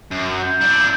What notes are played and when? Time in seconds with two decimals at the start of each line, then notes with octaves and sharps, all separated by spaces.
0.11 F#2
0.42 G6
0.61 D4 E4